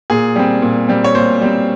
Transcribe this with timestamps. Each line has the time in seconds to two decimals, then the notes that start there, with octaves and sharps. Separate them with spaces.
0.10 A#2 G#4
0.36 G3 C4
0.62 A#2
0.88 G3 C4
1.04 C#5
1.15 A#2 C5
1.42 G3 C4